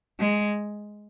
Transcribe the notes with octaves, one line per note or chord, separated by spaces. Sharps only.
G#3